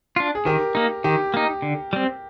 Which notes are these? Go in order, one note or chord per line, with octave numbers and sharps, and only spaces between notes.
D4 F4
G#4
D#3 G4 A#4
A#3 D#4
D#3 G4
A#3 D#4
D3
G3 C4